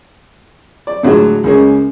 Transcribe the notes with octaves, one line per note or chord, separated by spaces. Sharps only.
D5
A2 D3 F#3 G#3 F4 F#4
C#2 G#3 A#3 C#4